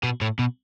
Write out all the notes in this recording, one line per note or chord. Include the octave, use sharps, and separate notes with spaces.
B2
A2
B2